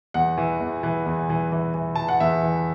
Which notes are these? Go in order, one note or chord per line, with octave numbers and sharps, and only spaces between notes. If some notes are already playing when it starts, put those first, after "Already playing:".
E2 F#5
E3
E2
E3
E2
E3
E3
E3
E3 A5
F#5
E2 E5
E3